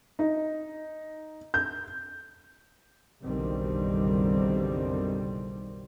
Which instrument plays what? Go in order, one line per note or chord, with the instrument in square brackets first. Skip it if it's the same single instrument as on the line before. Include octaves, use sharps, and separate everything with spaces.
[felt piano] D#4
G6
[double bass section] F#1 B1 D3 D#3 G3 C4